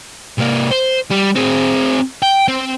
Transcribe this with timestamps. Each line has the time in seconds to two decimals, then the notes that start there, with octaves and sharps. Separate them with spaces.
0.39 C3 A#3
0.71 C5
1.10 G3
1.36 C4 G#4
2.22 G5
2.48 C4